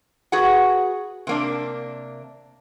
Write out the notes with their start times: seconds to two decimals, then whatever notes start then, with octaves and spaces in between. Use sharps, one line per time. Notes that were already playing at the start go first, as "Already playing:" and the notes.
0.32 F#4 G#4 B4 F#5
1.27 C3 A#3 D4